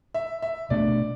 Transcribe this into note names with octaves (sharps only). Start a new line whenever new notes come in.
E5
E5
B2 A3 D4 D5